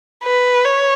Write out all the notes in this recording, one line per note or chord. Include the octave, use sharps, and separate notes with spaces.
B4
C#5